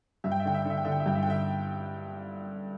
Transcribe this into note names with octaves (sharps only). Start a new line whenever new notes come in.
G2 E5
G5
E5
D3 G5
E5
G5
D3 E5
G5
D3 E5
G5
E5
G2 G5
E5
G5
D3 E5